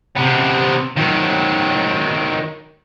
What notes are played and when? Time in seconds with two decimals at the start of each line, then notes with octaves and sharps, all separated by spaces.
0.16 C3 B3
0.96 D#3 F#3